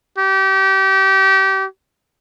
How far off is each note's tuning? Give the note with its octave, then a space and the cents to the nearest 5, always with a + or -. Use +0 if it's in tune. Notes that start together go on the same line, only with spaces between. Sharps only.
G4 -30